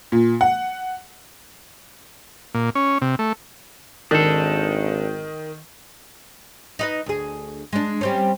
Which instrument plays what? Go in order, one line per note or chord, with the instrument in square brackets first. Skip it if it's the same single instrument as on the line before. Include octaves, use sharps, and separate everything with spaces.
[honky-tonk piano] A#2
F#5
[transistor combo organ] A#2
C#4
C3
A3
[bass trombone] G#1 [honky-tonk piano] D#3 [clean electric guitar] D4 A4
[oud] D#4 B4 D#5
D2 G#4
G#3 D4
G3 C4 C#4